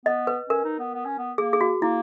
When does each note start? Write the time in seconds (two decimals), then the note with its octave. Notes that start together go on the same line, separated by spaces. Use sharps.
0.06 B3 D#5
0.27 B4
0.50 C#4 A#4
0.64 D#4
0.79 B3
0.94 B3
1.06 C#4
1.18 B3
1.38 A#3 G#4
1.53 G#4
1.61 F#4
1.82 A#3 E4